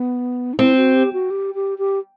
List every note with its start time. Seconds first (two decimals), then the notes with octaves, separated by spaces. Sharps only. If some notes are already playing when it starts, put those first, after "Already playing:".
Already playing: B3
0.54 D#4
0.59 C4 E4
0.76 F#4
0.95 G4
1.13 F#4
1.31 G4
1.55 G4
1.78 G4